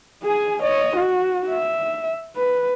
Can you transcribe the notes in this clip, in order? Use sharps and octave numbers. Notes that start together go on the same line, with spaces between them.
G#4 G#5
C#5 D#5
F#4
E5
B4